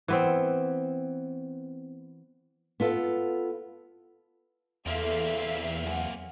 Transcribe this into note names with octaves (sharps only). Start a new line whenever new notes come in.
E3 B3 C4
B3 F4 A4
E2 A#3 C4 A4 D5 E5 F5
F#3 F#5 G#5